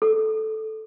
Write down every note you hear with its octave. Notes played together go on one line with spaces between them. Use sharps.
A4